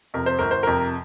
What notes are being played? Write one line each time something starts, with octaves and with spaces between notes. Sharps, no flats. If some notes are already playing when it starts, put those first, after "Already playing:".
F2 C3 A#4
C5
G1 A#4
C5
F2 C3 A#4